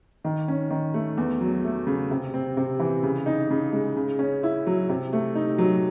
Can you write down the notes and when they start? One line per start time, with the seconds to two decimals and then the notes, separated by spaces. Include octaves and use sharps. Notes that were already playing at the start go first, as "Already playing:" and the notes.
0.25 D#3
0.48 C#4
0.70 D#3
0.94 A3
1.17 E2
1.41 F#3
1.64 A3
1.87 C#3
2.11 C3
2.34 C4
2.57 C3
2.79 E3
3.03 C#3
3.26 D#4
3.50 C#3
3.72 G#3
3.96 C#3
4.19 C#4
4.43 E4
4.67 F#3
4.89 C3
5.13 A3
5.35 D#4
5.58 F#3